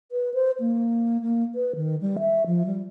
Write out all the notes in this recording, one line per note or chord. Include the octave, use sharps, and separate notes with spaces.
B4
C5
A#3
A#3
B4
D#3
G3
E5
F3
G3